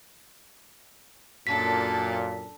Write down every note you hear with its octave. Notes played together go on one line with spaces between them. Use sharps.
F#2 A#2 D4 A4 B6